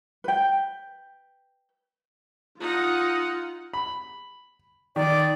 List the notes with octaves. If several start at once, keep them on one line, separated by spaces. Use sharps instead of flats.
B4 G5
D#4 F4 F#5
B5
D#3 D5